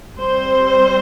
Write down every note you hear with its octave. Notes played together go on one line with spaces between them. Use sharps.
G3 C4 C5